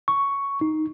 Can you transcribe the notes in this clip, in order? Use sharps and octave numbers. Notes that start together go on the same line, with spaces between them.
C#6
D#4